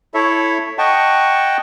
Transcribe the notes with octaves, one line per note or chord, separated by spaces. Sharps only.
E4 A4 C#5 E5
D#5 F#5 G5 A5 C#6